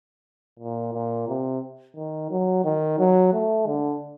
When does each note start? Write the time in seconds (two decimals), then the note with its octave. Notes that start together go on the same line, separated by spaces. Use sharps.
0.59 A#2
0.94 A#2
1.28 C3
1.96 D#3
2.31 F#3
2.64 D#3
2.99 F#3
3.33 A3
3.67 D3